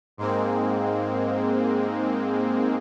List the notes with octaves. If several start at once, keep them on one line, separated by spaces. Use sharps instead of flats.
G#2 G#3 A#3 C4